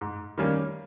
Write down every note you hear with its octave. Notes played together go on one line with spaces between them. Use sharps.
G#2
D#3 G3 A#3 C#4